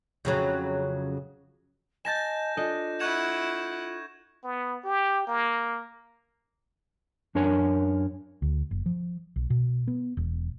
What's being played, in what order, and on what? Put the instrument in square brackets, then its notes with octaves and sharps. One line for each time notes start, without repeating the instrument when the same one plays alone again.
[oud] F2 C#3 F#3
[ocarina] D#5 [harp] G#5 A5 A6 [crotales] G6 A#6 E7
[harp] D4 A4 D#5 [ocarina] F4
[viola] E4 F#5 [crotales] C#6 G#6 E7
[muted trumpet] B3
G4
A#3
[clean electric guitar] F#2 D4 A#4 C#5 G#5
[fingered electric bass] D2
F#1
F3
B1
B2
B3
E1